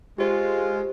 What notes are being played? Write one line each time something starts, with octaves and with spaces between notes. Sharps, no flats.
G#3 F4 G4 C5